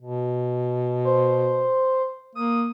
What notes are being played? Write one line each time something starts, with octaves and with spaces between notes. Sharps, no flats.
B2
C5
A#3 D#6